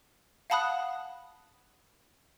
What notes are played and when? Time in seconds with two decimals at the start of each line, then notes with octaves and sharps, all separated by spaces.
0.50 F5 F#5 A5 B5 D#6 F#6